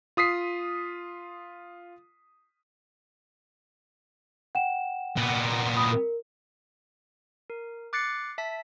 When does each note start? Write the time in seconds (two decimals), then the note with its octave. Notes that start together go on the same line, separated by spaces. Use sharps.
0.17 F4 D#6 B6 C7
4.55 F#5 G5 E7
5.17 A#2 B3
5.76 B5 D#6
5.92 A#4
7.50 A#4
7.93 D6 F#6 A6 C7 C#7
8.38 E5 A5 B6